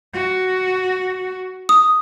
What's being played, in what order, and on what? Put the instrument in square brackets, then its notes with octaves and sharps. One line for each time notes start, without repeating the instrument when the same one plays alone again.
[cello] F#4
[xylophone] D#6